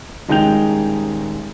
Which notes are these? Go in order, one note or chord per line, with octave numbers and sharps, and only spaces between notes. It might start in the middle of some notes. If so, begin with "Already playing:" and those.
D#1 G#3 D#4 G5 G6 F7